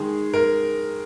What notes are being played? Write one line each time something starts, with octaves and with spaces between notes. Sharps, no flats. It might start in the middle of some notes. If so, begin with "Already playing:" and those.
Already playing: D#3 G#3 G#4
A#4